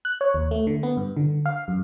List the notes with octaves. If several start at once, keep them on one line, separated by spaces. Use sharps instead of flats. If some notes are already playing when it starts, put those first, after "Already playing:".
F#6
C#5
D#2
A3
D3
B3
G2
D3
F5
F#2